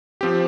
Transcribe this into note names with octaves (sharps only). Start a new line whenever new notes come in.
F3 C4 G4